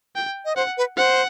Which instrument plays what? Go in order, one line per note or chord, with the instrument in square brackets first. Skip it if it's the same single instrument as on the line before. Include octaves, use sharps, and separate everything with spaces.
[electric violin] G5
[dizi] D#5
[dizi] C5 [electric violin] F#5
[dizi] B4
[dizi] C5 [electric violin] F#5